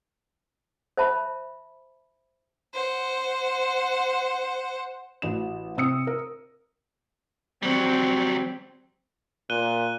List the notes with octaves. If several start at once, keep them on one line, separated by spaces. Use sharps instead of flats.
C5 E5 A5 B5
C5 F#5
A1 F#4 E7
C3 C4 D#6 E6 C#7
A#4
F#3 G3 C4
A#2 F#6 D#7 G7